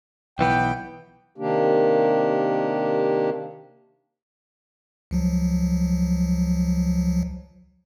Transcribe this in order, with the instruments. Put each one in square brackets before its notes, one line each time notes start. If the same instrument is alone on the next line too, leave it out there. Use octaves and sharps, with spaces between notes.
[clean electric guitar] B1 E3 B3 [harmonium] G5
[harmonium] C3 D#3 A#3 D4 G4
[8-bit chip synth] C#2 F3 F#3